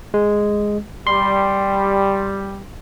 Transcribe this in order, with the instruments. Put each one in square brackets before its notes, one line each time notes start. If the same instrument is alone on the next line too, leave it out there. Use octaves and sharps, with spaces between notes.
[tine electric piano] G#3
[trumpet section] G3 [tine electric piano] C6